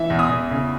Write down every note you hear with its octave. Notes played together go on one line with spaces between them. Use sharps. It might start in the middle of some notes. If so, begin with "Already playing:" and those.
Already playing: E3 E5
E2
D#6
E2
C#3